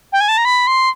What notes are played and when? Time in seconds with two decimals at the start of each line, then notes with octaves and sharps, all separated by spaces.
0.13 G5
0.21 G#5
0.28 A5
0.38 A#5
0.45 B5
0.67 C6